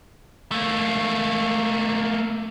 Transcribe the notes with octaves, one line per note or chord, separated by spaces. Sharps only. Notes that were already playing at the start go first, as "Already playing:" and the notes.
A3 A#3